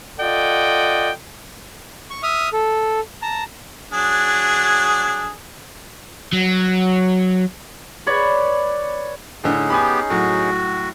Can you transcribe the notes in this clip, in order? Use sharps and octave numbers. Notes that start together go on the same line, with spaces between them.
F4 A4 D5 D#5 F#5 G5
C#6
E5 D#6 F6
A4
A5 A#5
F#3 D4 G#4
F#3
B4 C#5 D5
A2 D3 C#4 D#4 G#4
B3 G4 G#5 B5
A2 F#3 F#4